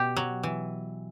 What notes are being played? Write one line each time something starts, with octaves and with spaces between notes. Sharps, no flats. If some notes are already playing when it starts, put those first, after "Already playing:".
Already playing: B2 G4
F#3
E3